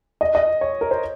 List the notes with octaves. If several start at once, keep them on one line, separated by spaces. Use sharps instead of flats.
D#5
D#5
C#5
A#4
C5